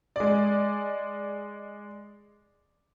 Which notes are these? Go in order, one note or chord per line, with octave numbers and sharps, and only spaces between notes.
G#3 D5